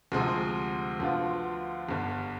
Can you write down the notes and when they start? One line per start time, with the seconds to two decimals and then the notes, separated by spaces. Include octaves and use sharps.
0.12 D2 C3 F3 G#3
1.00 D2 D3 F3 B3 F4
1.89 G1 G2 D3